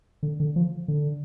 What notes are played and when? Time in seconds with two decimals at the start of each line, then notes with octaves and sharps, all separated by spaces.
0.23 D3
0.40 D3
0.56 F3
0.88 D3